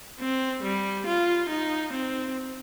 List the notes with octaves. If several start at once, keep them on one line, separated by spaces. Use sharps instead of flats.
C4
G3
F4
D#4
C4